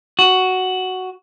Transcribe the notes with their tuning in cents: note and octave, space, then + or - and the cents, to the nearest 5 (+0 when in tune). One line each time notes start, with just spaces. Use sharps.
F#4 +5